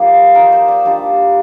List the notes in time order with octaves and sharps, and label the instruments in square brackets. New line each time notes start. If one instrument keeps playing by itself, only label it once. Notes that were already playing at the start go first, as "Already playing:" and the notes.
Already playing: [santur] F3 A#3 D#4 G4
F3 A#3 D#4 A#4
C5
D5
G3 A#3 D4 F4